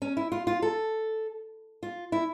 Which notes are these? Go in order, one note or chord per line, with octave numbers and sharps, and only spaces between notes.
C#4
E4
F4
F4
A4
F4
E4